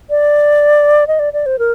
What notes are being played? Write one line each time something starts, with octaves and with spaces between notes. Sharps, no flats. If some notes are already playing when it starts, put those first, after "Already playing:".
D5
D#5
D5
D5
C5
A#4